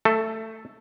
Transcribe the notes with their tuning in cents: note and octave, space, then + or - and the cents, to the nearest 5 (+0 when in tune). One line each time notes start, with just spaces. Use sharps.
A3 +15 A4 +0